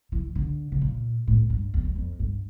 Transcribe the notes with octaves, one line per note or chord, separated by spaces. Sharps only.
E3
D3
C#3
A#2
A2
G2
E2
E2
F2
G2